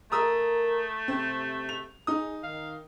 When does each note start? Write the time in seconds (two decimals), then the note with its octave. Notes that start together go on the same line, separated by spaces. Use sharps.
0.12 A3 A#4 A#5 D#6 E6
1.08 C3 C4
1.69 F7
2.07 D#4 G#4 D#6
2.43 D#3 F5